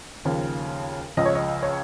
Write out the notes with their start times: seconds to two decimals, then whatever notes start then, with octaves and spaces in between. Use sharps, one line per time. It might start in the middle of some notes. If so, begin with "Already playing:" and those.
0.25 D#2 C#3 F3
1.17 C#2 C#3 F3 D#5
1.25 C#5
1.35 D#5
1.63 C#5